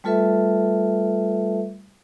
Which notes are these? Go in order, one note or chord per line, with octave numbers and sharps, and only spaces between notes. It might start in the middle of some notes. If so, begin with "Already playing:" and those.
G3 A3 F4 A4 B4 E5